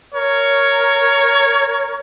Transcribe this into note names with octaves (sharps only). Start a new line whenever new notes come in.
A#4 C#5